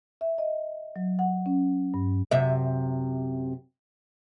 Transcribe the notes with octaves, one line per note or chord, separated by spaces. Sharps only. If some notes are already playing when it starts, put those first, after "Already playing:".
E5
D#5
F#3
F#5
C#4
G2
F#2 C3 E5